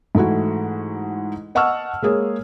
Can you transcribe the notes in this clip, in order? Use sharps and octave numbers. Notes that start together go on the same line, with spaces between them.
G#2 E3 A3 E4 F#4
D#5 F#5 A5 C#6 E6 F6
G#3 A#3 G#4 C#5